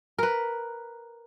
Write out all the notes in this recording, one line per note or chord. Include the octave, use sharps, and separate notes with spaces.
A#4 B4